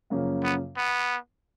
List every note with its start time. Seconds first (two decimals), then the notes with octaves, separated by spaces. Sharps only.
0.10 F#2 C#3 F3 A#3 C#4
0.44 B3
0.77 B3